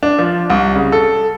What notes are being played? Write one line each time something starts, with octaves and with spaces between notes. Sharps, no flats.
D4
F3
C2
C#3
A4